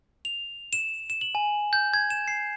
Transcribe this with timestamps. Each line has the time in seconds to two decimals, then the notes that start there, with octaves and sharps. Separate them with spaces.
0.25 F7
0.73 E7
1.10 E7
1.21 F#7
1.35 G#5
1.73 G6
1.94 G#6
2.10 E7
2.28 C7